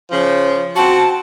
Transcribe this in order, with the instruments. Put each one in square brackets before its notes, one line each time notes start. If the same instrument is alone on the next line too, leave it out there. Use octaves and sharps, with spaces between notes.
[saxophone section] C#3 F3
[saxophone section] C4 F#4 [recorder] A5